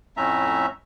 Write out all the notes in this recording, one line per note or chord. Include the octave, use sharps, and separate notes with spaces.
F2 A2 A3 C#4 E5 A#5